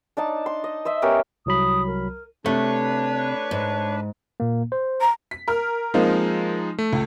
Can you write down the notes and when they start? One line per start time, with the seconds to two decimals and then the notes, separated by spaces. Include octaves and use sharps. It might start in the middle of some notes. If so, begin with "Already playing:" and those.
0.17 D4 D#4 A5
0.46 C6
0.64 D#5
0.85 C5 D#5 E5
1.02 B3 C#4 G4 A#4
1.46 C2 F#3 B5 D#6
1.86 A#4
2.46 C3 A3 D4 B4 C#5
3.51 G#2
4.40 A#2 A#3
4.72 C5
5.01 A#5
5.31 B6
5.48 A#4 F6
5.94 F3 G#3 A#3 C4 D#4
6.78 A3
6.93 C#2